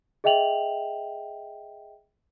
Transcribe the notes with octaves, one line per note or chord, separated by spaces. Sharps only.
G#4 D#5 E5 G5 F7 F#7